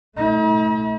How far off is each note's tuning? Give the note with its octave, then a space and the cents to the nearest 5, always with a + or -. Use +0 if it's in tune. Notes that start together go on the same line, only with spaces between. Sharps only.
A3 -5 D#4 +45